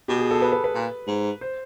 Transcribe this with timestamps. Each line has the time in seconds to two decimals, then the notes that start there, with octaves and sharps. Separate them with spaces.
0.08 B2 G4
0.19 G#4
0.31 A4
0.42 B4
0.52 B4
0.64 B4
0.75 A#2
1.07 G#2
1.41 C5